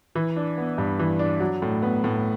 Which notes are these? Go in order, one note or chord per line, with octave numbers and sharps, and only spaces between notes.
E3
D4
B3
G2
E3
D4
F#3
A2
B3
A2